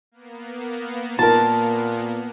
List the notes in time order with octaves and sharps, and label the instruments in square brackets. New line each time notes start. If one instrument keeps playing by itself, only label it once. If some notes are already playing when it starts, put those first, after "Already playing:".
[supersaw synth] A#3 B3
[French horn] A#2 [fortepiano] F4 A#4 [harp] A5